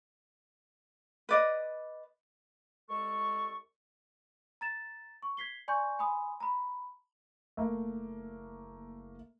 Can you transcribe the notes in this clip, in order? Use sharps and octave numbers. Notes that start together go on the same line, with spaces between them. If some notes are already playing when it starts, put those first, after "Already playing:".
B4 D5 D#5
C2 G#3 A4 C#6
A#5 A6 E7
C#6
G#6 B6 C7 G7
D5 G#5 C6 C#6 G6
G#5 B5 C6 D#6
A#5 B5
F#1 A3 A#3